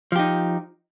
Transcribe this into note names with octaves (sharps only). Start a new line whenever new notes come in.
F3 D#4 G4